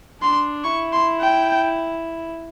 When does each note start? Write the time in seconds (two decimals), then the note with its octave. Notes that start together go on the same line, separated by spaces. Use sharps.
0.21 D4 C6
0.64 E4 C#6
0.93 C6
1.21 G5